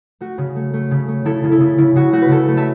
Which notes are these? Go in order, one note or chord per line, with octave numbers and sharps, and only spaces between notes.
A3 F#4
C#3
A3
A3
C#3
A3
C#3 E4 A4
C#3
E4 A4
C#3
C#3 E4
C#3 F#4
A3 F#4
B4
C#3 E4 A4
A3
E5 A5